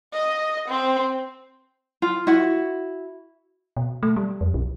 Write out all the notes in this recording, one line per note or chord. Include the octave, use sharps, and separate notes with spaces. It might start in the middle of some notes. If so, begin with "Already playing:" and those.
D#5
C4
F4
E4 F#4
B2
A3
G3
F2
B1